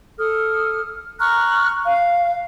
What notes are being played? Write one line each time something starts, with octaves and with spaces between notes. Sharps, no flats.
A4 D#6 F6
A#5 C#6 F6 F#6
F5